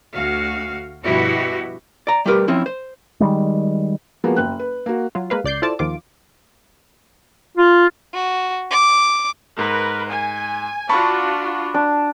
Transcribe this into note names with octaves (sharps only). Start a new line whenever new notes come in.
D2 F#4 F5
G2 B2 F3 E4 F#4 G4
D5 A#5
G3 A3 G4 A#4 B4
F3 C4 C#4 E4
C5
D#3 G3 G#3
F3 G#3 A#3 B3 F#4
F#1 G5 F#6
B4
A#3 F#4
F#3 F4
G#3 A#3 B4 F5
C#2 D5 G6 C7
E4 F4 A4 C5 D5 A5
D#2 D#3 F3 F4 D6
F4
F#4
D6
G#2 A#4 B4
G#5
D4 F4 F#4 A5 B5 C#6
D4